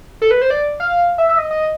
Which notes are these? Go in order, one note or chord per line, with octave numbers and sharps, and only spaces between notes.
A4
B4
C5
D5
F5
E5
E5
D#5
D#5